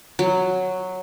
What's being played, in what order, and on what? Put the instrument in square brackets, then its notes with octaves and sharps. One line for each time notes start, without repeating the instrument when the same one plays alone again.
[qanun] F#3